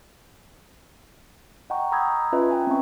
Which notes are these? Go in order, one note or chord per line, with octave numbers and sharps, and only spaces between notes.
D#5 F#5 G5 A#5 C#6
A#5 B5 D#6 E6 G6 G#6
C#4 F4 B4 D#5 E5
G5 G#5 A#5
C4 C#4 E5 C#6